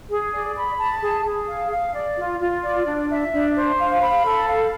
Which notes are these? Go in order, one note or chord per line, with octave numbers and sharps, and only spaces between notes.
G#4
D5
B5
A5
G#4
G#4
F5
F5
D5
F4
F4
D5
D4
E5
D4
C5
F5
B5
A4
F5